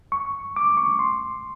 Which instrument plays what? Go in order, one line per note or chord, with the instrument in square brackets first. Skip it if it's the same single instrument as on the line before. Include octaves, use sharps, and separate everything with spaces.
[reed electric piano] C#6
D6
C#6
C6